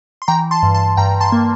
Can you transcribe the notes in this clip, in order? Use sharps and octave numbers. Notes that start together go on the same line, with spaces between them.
C6
E3 G5 A#5
A5 C6
G2
A5 C6
G2 G5 A#5
A5 C6
A#3